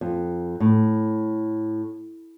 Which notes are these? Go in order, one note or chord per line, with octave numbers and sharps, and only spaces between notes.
F2
A2